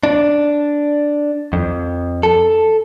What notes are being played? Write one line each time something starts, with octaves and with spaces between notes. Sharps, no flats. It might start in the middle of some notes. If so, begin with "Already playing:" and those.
D4
F2
A4